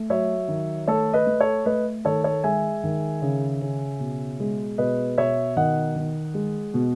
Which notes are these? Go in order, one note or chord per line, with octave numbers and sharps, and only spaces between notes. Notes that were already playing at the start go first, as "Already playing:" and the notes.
Already playing: A3
F#3 C#5 E5
D#3
A3 A4 C#5
B4 D#5
A3
A4 C#5
A3 B4 D#5
D#3 A4 C#5
A4 C#5
G#3 E5 G#5
D#3
C#3
C#3
B2
G#3
B2 B4 D#5
B2 C#5 E5
D#3 D#5 F#5
D#3
G#3
B2